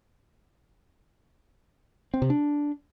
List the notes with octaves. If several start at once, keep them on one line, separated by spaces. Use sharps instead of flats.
C4
C3
D4